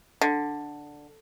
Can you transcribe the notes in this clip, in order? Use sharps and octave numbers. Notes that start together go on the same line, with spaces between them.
D3